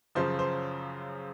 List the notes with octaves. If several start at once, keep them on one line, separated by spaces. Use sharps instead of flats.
F#2 C#3 F3 C5
C5